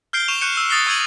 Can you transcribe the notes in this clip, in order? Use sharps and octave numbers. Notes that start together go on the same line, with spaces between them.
F6 G6 C7 D7 G7
C#6 E7 F7
C#6 F#6 G6 C#7 E7 F7
E6
D#6 A6 A#6 C7 G7
C#6 E6 G#6 C#7 D#7 F#7